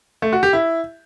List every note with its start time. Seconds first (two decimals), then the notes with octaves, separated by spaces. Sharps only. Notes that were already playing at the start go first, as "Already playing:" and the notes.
0.22 A3
0.33 F#4
0.43 G4
0.53 E4